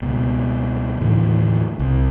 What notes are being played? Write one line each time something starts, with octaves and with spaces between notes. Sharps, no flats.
C#2 B2
D#2 A2 D3 E3
C2